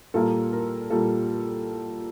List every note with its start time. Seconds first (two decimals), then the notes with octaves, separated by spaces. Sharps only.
0.14 A#2 G3 A#3 A4
0.53 A#4
0.90 A#2 G3 A#3 A4